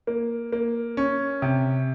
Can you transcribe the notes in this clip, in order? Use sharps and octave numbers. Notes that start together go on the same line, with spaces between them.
A#3
A#3
C#4
C3